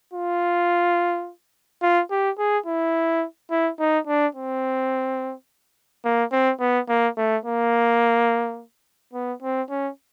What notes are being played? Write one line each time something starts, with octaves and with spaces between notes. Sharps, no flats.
F4
F4
G4
G#4
E4
E4
D#4
D4
C4
A#3
C4
B3
A#3
A3
A#3
B3
C4
C#4